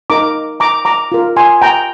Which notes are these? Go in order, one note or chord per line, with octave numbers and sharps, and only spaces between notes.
D#4 A#4 A#5 D6
A#5 D6
A#5 D6
F4 A#4
G#5 C6
G5 A#5